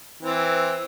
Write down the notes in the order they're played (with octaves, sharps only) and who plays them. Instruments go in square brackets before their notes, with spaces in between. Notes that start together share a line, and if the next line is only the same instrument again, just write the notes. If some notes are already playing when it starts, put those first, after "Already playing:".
[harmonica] E3 C4